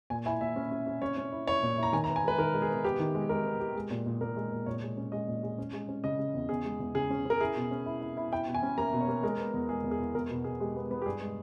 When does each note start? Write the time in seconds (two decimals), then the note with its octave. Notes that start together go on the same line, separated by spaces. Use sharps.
0.10 A#2 G#5
0.26 E4 G#5
0.41 A#2 E5
0.56 C#4
0.71 C#4
0.87 C#4
1.02 C#4 C#5
1.17 C#4
1.32 E4
1.47 E4 C#5
1.63 A#2
1.78 E4
1.83 A#5
1.93 D#3 G#5
2.04 A#5
2.09 B3
2.16 G#5
2.24 G#3 B4
2.38 D#3 A#4
2.54 G#3
2.62 G#4
2.69 B3
2.84 B3 G4
3.00 D#3
3.15 G#3
3.29 G#3 A#4
3.45 B3
3.60 G4
3.76 G#3
3.91 A#2
4.06 A#2
4.21 A#2 A#4
4.36 G#3
4.51 A#2
4.66 A#2 C#5
4.82 G#3
4.97 C#4
5.12 G#3 D#5
5.28 A#2
5.43 G#3
5.58 C#4
5.73 G#3
5.88 C#4
6.04 C#3 D#5
6.19 C#3
6.34 E2
6.49 E2 G#4
6.64 G#3
6.80 E2
6.95 C#3 G#4
7.10 C#4
7.25 C#4 A#4
7.40 E4 G#4
7.56 B2
7.71 C#4
7.86 E4
8.01 E4
8.17 E4
8.32 E4 G5
8.47 B2
8.54 G#5
8.63 C#4
8.78 A#3 A#5
8.93 B2
9.01 C#5
9.08 A#3
9.23 G#3 A#4
9.38 B3
9.54 E2
9.69 G#3 G#4
9.84 E2
9.91 G#4
10.00 E2
10.15 E2 A#4
10.30 B2
10.44 B2 G#4
10.60 G#3 G4
10.76 B3
10.91 B3
11.02 G4
11.06 G2 G#4
11.21 G#3